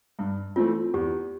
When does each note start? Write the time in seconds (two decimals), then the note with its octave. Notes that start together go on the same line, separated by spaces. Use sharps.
0.19 G2
0.56 E3 A3 C4 F4
0.94 E2 G4